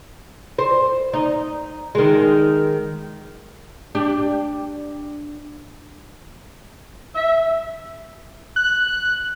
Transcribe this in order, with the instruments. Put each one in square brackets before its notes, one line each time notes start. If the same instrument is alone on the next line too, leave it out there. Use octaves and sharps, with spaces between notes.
[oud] C5
D#4
D#3 G#3
D4 G4
[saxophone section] E5
[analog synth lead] F#6